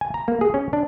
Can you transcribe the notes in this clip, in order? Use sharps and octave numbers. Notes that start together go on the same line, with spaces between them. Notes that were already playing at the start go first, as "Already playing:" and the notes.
G#5
A#5
A#3
G#4
C#4
D4